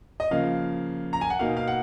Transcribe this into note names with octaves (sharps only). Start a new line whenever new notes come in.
D#5
C#3 F3 A#3 F5
A#5
G#5
F#5
B2 A#3 D#4 F5
F5
F#5